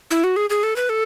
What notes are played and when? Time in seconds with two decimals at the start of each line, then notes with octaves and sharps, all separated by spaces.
0.11 E4
0.24 F#4
0.36 G#4
0.50 G#4
0.63 A4
0.76 B4
0.89 A4